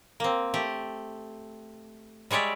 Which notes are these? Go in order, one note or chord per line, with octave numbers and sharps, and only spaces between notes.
A#3 C4
A3 G4
G3 G#3 C#5 D5 E5